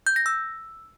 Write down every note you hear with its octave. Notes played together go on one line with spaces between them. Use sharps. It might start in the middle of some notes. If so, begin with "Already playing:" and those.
G6
A#6
E6